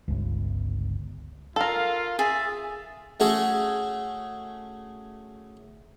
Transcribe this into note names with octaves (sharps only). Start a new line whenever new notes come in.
G1 C#2
F4 A4 A#4 F5
G#4 E5 A6
A3 C#4 F#4 G#4 A4